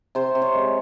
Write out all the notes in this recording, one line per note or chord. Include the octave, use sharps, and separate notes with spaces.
C3 C5
C3
C#5
G#3